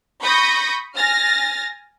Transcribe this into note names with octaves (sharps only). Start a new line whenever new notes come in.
B5 C#6 D#6 G6 A#6
G#5 F6 A6 A#6